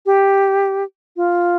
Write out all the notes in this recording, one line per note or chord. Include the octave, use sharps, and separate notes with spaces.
G4
F4